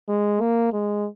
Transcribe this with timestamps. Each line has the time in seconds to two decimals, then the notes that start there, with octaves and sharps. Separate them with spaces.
0.09 G#3
0.41 A#3
0.73 G#3